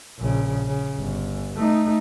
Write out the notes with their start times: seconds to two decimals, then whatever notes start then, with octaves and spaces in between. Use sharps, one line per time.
0.20 A#1 C#3
0.67 C#3
0.98 G1
1.56 A3 D#4